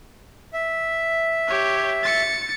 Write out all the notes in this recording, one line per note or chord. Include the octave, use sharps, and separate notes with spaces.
E5
G4 C#5
A6 C#7